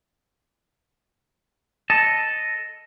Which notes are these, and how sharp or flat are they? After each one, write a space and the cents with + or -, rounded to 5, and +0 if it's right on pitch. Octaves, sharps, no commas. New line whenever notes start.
A4 +0 D#5 +0 A5 +0